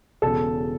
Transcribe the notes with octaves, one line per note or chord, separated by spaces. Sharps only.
E1 E2 C#3 A4